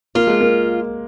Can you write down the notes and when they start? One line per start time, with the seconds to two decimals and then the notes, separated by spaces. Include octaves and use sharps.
0.15 A#3 F4
0.27 G#3
0.41 A#3